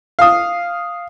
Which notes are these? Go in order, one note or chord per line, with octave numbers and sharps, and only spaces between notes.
F5 D#6